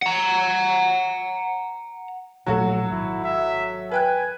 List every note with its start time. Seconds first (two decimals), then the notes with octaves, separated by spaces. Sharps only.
0.02 F#5 A#5
2.46 D#1 A#1 A2 F#3 F#4 A4
2.90 G#1 E4
3.24 E5
3.91 B4 G5 G#5 F#6